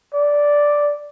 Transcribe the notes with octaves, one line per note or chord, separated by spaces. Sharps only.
D5